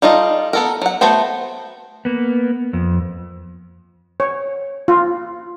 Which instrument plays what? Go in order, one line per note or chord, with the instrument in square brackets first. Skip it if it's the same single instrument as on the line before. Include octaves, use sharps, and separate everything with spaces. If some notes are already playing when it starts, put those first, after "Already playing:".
[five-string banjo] G3 D#4 F4 A4 D#5
B3 A4 A#4
F#3 F#5
A3 B3 F#4 C5 G5
[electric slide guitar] A#3 B3
F2
[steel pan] C#5
F4